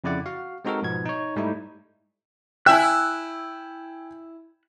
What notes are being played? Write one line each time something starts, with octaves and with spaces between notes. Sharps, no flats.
F2 C#3 E4 D5 F#5
F#4 F5
G#3 C4 D#4 F#4 A4 A#4
G#2 B2 F3 B3 G#6
D#4 C#5
G#2 G3 A3 D#4 E4
E4 E5 G5 G#5 F#6